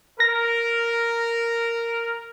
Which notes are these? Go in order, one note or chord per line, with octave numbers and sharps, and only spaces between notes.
A#4 A#6